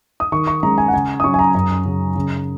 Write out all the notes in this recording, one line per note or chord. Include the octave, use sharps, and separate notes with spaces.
D#6
D#3 C#6
C#6
G#3 C#4 A#5
G#5
F#5
C#3 G#5
D#6
F#3 C#4 C#6
G#5
A#5
F#2 A#5
C#3 F#3
C#3